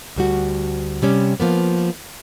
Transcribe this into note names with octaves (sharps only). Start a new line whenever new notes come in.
D2 G3 F#4
C3 G3 C#4
F3 A#3 B3